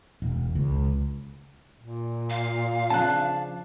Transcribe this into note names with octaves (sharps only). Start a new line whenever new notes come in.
E1
C#2
A#2
F5
C#3 F3 D4 A5 F#6